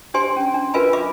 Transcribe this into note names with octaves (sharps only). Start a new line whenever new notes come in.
D4 G4 C5 G#5 C6
C#4
D4
F4 A#4 B4 E5 G#5 B5
E5 B5 D6